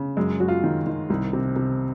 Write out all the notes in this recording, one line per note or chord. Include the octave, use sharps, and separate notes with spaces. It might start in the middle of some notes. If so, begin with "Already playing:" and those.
Already playing: C#3
F#2 G#3
F#2 F#4
F4
D#3
D#3
C2
C3
C3